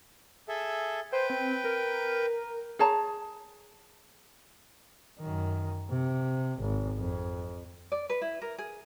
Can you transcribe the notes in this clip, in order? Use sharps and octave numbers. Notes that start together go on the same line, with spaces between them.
G#4 A4 E5
B4 C5 G5
C4
A#4
G#4 C#5 A5 A#5
F#2 D#3
C3
G#1
F2
D5
B4
E4
A#4
G#4